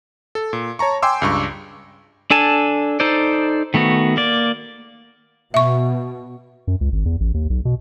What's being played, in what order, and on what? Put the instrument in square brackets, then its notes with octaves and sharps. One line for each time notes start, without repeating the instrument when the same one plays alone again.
[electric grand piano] A4
A#2
C#5 A5 A#5 C#6
G5 G#5 C6 D6 E6
C#2 G2 C#6
[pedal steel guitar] D4 A4 G#5 A5
D#4 A4 C5 D5
D#3 A3 B3 F#4
A#3 D5
[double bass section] B2 [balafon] E5 C#6
[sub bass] F#2
C#2
G#1
E2
A1
D#2
B1
B2